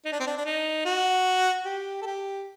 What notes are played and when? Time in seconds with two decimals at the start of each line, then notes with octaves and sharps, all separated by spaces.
0.05 D#4
0.12 D4
0.20 C4
0.27 D4
0.37 D4
0.45 D#4
0.85 F#4
1.65 G4
2.01 A4
2.06 G4